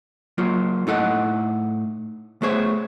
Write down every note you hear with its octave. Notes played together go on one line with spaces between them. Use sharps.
F#3 A#3 F4
A2 D#4 A4 F#5
A3 B3 G#4 C5 C#5